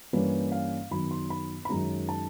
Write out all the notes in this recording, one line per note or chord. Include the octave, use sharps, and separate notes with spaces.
G2 E3 G3 A#3 C#4 B4
F5
F#2 D#3 F#3 B3 B5
C6
B5
B5
F#2 D#3 G#3 C#4 A#5
A5